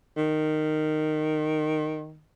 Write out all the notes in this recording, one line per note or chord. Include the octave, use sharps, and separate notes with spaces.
D#3